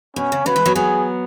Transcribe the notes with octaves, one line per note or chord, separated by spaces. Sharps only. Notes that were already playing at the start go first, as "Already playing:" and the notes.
B2 C#4
C#3
C#3 F#3 B4
E3 G#3
F#3 B3
F#3 B3 G#4